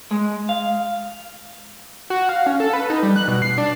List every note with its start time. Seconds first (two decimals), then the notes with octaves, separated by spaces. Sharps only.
0.11 G#3
0.49 F5
2.10 F#4
2.29 F5
2.46 C#4
2.60 A4
2.73 B4
2.90 D#4
3.03 G3
3.16 F#6
3.28 B2
3.42 C7
3.58 D4